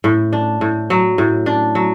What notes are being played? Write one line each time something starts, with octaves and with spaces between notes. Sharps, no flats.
A2
D4
A2
F#3
A2
D4
F#3